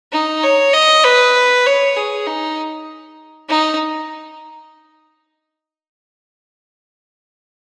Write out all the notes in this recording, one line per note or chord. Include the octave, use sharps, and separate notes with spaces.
D#4
C#5
D#5
B4
C#5
G#4
D#4
D#4